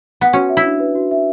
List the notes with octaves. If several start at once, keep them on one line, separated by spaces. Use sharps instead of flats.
B3
C#4 F#4
E5
E4
D4
B4
F#4
E5